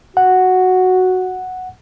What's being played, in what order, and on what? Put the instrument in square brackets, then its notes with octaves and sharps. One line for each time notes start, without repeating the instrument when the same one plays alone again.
[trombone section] F#4 [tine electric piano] F#5